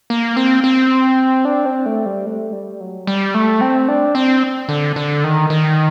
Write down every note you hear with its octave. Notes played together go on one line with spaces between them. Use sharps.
A#3
C4
C4
D4
C4
A3
G3
A3
G3
F#3
G3
A3
C4
D4
C4
D3
D3
D#3
D#3